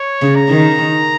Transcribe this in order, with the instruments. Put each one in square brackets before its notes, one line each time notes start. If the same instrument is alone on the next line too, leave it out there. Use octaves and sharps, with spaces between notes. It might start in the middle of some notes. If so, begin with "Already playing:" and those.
Already playing: [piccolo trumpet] C#5
[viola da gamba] C#3
[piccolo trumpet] A#5
[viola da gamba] D#3